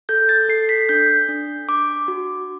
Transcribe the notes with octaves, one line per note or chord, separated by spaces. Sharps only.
A4 G6
A6
A4 C7
B6
D4 G6
D4
D4 D6
F#4